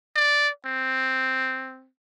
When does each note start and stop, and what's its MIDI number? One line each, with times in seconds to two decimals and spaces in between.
0.16 0.49 74
0.65 1.88 60